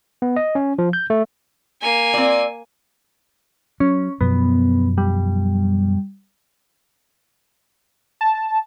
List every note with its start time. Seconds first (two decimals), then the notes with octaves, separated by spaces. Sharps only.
0.22 B3
0.36 D#5
0.55 C#4
0.79 F3
0.93 G6
1.10 A3
1.82 A#3 G#5
2.14 C4 F4 D5
3.80 F#3 C#4
4.21 F#2 B2 F3 B3
4.98 G3
8.21 A5